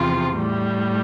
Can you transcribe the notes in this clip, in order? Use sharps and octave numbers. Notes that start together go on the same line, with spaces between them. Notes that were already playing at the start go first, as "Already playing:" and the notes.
Already playing: E2 C3 F3 F4
A2 G3